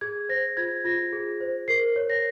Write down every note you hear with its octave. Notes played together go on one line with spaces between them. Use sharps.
G#4 G#6
C5 A#6
F4 G#6
F4 A#6
G#4
C5
A#4 C7
C#5
A#6